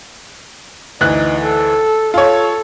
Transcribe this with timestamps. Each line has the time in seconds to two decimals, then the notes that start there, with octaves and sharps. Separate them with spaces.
1.01 D2 E3 D#4 F#6
1.41 A4
2.14 F4 A4 C#5